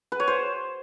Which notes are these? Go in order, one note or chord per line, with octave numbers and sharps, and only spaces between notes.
B4
C#5
C5